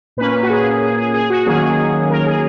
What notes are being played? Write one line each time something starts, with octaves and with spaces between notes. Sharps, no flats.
A#2 A#3 C#4 B4
F#4
G#4
G#4
G#4
G#4
F#4
D#3 F#3 A#3 C#4 G#4
A#4
G#4